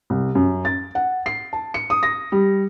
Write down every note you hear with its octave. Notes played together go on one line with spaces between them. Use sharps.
C2
F#2
A6
F#5
C7
A5
C#7
D#6
A#6
G3